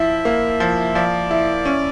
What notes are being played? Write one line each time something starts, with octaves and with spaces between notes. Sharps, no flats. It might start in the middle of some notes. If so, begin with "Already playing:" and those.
Already playing: F3 E4 E5
A#3
F3
F3 D5
E4
C#4